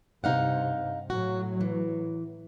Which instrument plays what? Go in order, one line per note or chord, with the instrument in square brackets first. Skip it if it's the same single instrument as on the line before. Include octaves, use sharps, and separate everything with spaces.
[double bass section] G2 C3 [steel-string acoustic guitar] D#4 F5 F#5
[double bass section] A2 F#3 [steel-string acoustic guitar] F#4
[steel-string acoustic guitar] E3